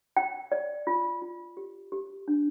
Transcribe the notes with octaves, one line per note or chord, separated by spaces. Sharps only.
G5
D5
F4
F4
G4
G4
D4